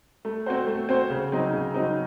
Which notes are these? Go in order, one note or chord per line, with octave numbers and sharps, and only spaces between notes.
A3
C4 F#4 C5
A3
C4 F#4 C5
C#3
F#3 C4 D#4
C#3
F#3 C4 D#4